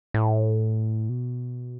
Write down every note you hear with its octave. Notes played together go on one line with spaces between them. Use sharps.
A2
B2